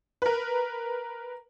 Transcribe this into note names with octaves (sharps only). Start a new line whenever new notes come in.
A#4 B4